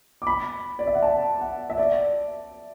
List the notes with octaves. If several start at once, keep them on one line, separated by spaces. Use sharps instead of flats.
D6
B5
D5
E5
F#5
A5
F#5
E5
D5